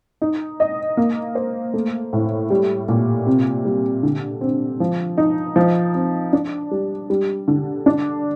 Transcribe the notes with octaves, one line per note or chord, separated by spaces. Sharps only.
D#4
D#5
A#3
C5
A3
A2
G3
A#2
C3
G3
D3
C4
F3
D#4
F3
C4
D4
G3
G3
D3
D4